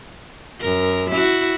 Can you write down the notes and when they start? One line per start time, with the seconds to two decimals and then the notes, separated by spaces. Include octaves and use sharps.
0.61 F#2 A#4
1.10 E4 F#4